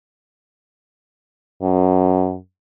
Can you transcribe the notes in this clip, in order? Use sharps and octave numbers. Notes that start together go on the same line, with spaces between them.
F#2